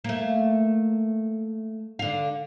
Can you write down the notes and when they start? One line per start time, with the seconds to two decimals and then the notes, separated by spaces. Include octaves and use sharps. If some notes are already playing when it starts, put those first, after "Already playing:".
0.04 A3 A#3
1.99 D3 F5